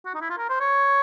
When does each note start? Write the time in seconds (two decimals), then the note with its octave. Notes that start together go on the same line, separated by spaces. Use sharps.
0.05 F#4
0.14 D#4
0.21 E4
0.30 F4
0.38 A#4
0.49 C5
0.60 C#5